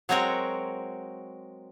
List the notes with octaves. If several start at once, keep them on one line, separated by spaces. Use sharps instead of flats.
F#3 G#3 C4 F#4 A#4